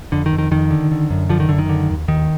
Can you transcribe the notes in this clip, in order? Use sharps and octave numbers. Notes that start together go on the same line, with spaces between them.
F2 D3
D#3
F2
D#3
F2 D#3
D3
D3
F#2
D3 F3
D#3
F#2 D3
D#3
D3
D#2
D#2 D#3